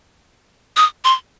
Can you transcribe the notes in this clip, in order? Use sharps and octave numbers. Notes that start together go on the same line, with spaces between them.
D#6
C6